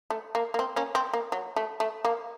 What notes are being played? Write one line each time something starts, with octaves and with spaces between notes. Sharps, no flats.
A3
A#3
A#3
C4
A#3 C#4
C4
A#3
F#3
A3
A3
A#3